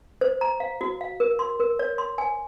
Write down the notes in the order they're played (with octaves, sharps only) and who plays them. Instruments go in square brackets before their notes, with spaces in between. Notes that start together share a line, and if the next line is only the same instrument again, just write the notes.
[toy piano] C5
A#5
F5
F#4
F5
A#4
C6
A#4
C#5
C6
G#5